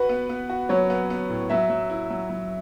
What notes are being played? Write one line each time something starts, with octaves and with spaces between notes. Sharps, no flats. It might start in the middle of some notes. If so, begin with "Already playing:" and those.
Already playing: F#4 B4
B3
B3
F#4
F#3 C#5
B3
B3
A2
F#3 E5
F#3
E4
F#3
F#3